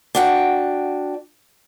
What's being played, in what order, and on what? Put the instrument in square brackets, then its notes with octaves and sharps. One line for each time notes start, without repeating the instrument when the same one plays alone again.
[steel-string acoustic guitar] D4 F#4 G5